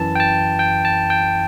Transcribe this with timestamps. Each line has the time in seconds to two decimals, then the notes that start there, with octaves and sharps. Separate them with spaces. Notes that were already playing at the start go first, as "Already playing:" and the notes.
Already playing: F#2 E3 A5
0.15 G5
0.20 A5
0.59 G5
0.85 A5
1.10 G5